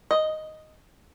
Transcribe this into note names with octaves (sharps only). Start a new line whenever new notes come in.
D#5